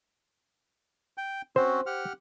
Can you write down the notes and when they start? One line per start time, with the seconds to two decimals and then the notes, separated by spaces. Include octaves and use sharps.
1.18 G5
1.56 C4 C#4 F#4 C5
1.86 G4 F#5 F6